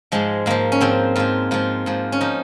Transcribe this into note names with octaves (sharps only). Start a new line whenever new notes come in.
G#2 F3 G#3
G#2 F3 A#3
C#4
G#2 F3 C4
G#2 F3 F4
G#2 F3 F4
G#2 F3
C#4
F3 D#4